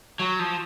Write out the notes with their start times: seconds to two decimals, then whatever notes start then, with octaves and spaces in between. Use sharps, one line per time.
0.19 F#3
0.39 F3